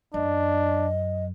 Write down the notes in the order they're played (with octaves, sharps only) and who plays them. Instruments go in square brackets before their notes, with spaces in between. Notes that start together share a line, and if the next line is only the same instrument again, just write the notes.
[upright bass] F#2 [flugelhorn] D4 [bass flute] D#5